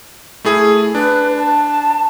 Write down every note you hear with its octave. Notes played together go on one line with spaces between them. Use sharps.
A3 E4 G#4
D4 B4
A5